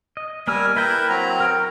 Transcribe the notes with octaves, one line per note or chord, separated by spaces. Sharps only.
D#5
G3 A#3 A#4 G#5 E6
E4 A#4 B4 E5 G5 B5
F#3 C4 A#5
A#4 G5